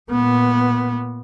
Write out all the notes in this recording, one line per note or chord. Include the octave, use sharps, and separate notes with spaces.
A#2 B3